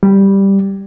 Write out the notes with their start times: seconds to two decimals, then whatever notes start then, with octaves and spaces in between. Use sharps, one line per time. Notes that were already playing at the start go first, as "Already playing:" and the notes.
0.03 G3